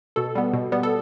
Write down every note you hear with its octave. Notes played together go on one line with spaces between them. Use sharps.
B2 A4
G3 B3
B2
G3 B3
A4